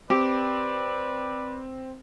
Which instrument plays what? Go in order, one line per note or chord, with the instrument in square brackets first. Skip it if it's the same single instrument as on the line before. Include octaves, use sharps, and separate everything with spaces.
[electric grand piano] C4 [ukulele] G4 [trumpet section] B4 D5